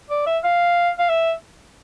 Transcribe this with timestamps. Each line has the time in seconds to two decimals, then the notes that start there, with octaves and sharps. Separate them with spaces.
0.10 D5
0.27 E5
0.44 F5
0.99 F5
1.09 E5